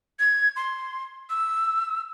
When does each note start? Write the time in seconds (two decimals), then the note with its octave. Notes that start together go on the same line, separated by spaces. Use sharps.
0.19 G#6
0.56 C6
1.30 E6